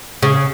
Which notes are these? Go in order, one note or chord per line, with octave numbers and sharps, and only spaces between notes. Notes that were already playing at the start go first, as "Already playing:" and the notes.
C#3